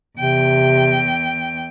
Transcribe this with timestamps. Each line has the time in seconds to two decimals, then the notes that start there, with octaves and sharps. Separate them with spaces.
0.19 E2 C3 G5